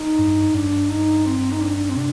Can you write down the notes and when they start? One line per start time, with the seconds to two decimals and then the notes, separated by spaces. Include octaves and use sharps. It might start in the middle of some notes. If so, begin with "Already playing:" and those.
Already playing: D#4
0.18 G2
0.54 G2 D4
0.89 D#4
1.26 C4
1.52 D#4
1.61 D4
1.89 C4
1.97 C3 D4